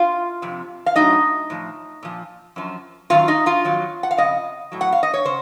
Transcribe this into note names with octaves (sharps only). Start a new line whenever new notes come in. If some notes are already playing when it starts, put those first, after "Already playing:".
Already playing: F4 F5
F2 C3
F5
A2 F#3 D#4 D#5
A2 F3
A#2 F3
F#2 F3
F#2 D#3 F#3 F4 F5
D#4 D#5
F4 F5
F2 D#3 F#3
F#5
F5
F2 C#3 D#5
A2 F#3
F#5
F5
D#5
C#5
C#3 C5